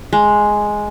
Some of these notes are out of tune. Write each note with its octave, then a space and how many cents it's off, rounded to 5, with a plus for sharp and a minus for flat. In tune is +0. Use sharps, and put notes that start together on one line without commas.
G#3 +5